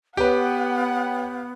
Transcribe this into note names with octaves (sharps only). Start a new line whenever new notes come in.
B3 G4 B4 C#5 F#5 G5